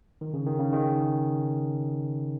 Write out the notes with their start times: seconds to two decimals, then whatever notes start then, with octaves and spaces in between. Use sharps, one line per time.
0.21 D#3
0.34 C#3
0.47 D#3
0.59 C#3
0.72 D#3